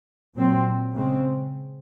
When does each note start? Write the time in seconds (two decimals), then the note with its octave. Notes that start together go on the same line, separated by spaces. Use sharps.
0.35 A#2 F#3 C4
0.94 C#3 G#3 C4